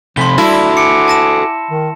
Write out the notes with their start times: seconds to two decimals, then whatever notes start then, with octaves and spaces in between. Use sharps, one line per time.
0.17 C3 F3 C4 A4 B5 C6 G7
0.38 G3 E4 F#4 A4 A5
0.77 F#5 G#5 D6 C#7
1.08 A5 A#6 E7
1.71 D#3